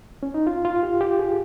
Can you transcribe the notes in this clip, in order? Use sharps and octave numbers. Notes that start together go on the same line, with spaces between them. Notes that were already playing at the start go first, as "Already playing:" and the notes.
C#4
D#4
F4
F4
G4
G4
G#4